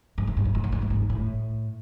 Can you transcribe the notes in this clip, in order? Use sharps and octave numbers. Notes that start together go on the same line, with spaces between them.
G#2
A2
G#2
A2
G#2
A2
G#2
A2
G#2
A2